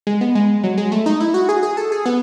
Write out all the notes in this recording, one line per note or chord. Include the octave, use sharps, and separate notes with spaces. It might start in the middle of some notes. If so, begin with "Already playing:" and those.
G#3
B3
G#3
F#3
G#3
A3
D#4
E4
F#4
G#4
G#4
A4
G#4
B3